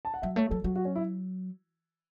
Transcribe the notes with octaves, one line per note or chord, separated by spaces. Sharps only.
A5
F#5
F#3 E5
A3 C#5
F#3 A4
F#3 F#4
F#4
C#4
E4